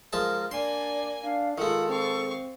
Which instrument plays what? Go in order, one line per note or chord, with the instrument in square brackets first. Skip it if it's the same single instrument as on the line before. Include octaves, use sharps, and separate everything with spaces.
[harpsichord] F3 G#3 A5 [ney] A#4
[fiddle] A#3 G#5 [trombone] D4 [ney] D5 [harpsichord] C6
[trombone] D4 [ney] F5
[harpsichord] D#3 G#3 [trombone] F4 [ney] A4 [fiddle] F#5
[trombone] C4 [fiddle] F5 C#6